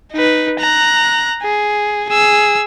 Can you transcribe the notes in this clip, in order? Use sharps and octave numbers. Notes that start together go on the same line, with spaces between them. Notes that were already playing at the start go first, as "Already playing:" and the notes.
D#4 B4
A#5 F#6
G#4
G#4 E6